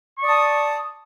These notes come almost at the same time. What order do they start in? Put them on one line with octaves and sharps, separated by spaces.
C#6 D5 D#6 A5